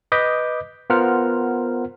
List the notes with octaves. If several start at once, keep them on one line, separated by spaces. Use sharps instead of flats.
B4 D#5 D6 D#6 G6 B6
B3 F4 A#4 C5 F#5 F6